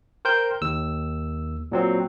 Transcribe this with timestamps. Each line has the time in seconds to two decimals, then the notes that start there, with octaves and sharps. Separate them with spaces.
0.25 A#4 C5 G5 G6
0.62 D#2 E6
1.72 A#2 F#3 C4